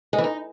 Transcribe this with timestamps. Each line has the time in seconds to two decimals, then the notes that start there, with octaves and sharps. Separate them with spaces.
0.13 G#3
0.18 E3
0.24 D#4